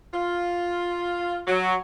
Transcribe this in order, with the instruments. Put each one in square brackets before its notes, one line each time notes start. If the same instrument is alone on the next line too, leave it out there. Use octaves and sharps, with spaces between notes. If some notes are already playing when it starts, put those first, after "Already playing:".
[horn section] F4
F#3